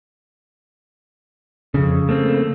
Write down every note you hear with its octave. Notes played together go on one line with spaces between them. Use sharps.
F2 C#3
A3 A#3 C4